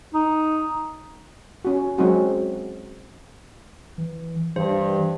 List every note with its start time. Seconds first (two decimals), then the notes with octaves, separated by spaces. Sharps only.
0.14 D#4
1.65 C#4 F#4
1.98 F#3 G#3 C4 C#4 D#4 F#4
3.98 E3
4.56 G2 E3 C5